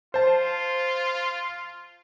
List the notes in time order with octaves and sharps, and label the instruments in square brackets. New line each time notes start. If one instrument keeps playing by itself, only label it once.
[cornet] F4 [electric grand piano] C5 A5